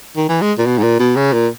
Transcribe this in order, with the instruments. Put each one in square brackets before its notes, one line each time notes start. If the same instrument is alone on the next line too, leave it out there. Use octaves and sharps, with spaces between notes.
[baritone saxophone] D#3
E3
G#3
A#2
B2
G#2
A#2
B2
C#3
A#2